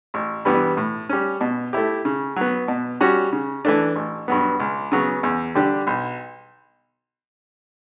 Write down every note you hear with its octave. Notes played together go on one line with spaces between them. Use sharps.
A1
G2 E3 G3 B3
A2
G3 C#4
B2
A3 E4 G4
C#3
F#3 B3
B2
G3 C#4 F#4
C#3
E3 A3 D4
A1
G2 F#3 B3
C#2
C#3 F#3 B3
E2
D3 G3 D4 G4
B1